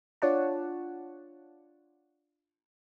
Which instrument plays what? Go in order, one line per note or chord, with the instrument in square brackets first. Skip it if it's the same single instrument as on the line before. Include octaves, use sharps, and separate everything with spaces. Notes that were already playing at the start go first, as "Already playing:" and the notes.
[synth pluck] D4 F4 C#5 D5 F#5 A5